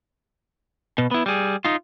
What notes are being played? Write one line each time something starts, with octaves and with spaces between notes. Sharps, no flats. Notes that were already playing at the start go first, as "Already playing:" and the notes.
B2
B3 E4
G3 G#4
D#4 F4